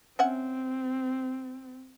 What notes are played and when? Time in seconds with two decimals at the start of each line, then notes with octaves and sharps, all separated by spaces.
0.19 C4 C#4 E5 F#5